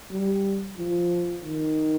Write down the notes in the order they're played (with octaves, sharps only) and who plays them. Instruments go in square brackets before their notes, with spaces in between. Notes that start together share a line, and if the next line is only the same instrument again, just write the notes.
[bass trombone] G3
F3
D#3